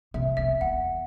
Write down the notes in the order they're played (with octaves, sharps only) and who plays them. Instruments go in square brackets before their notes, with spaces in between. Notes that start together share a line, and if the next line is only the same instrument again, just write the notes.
[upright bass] C3 [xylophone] E5
[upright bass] E2 [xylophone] E5
[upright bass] E2 [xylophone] F#5